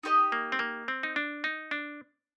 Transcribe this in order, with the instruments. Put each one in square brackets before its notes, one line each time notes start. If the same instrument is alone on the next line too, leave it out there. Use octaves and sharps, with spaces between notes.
[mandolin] D#4 G4 C5 D#5
[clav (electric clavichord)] A#3
C4
A#3
C4
D#4
D4
D#4
D4